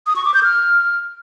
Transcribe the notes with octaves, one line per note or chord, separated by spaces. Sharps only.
D#6
C#6
D6
G6
F6